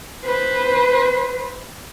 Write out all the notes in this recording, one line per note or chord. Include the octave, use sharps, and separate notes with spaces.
B4 C5